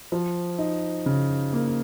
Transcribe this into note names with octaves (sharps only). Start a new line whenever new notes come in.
F3
D#4
C#3
A#3